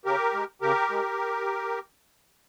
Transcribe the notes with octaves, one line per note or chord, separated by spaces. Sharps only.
C#3 G4 A#4
G#3
C#3 G4 A#4
G#3